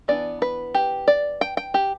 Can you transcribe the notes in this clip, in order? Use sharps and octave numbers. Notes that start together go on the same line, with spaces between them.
E3 B3 D4 D5
B4
G4
D5
G5
G5
G4